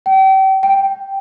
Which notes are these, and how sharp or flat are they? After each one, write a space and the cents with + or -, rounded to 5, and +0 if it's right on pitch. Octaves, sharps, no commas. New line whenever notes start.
G5 -35
G5 -5